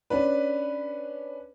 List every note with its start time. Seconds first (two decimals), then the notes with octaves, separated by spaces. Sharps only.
0.10 C#4 D4 B4